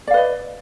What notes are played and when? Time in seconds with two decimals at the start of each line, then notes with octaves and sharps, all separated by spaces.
0.07 D5
0.11 F5
0.14 B4
0.17 D#5